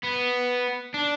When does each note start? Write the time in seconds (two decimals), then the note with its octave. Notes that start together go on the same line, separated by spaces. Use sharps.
0.04 B3
0.94 D4